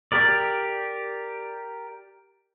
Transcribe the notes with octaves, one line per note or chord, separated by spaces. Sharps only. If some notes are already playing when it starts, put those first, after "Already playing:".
G4 A#4 D5